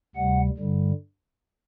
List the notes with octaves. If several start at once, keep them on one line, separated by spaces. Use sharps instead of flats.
D2 C3 G3 F#5
G2 D3 G3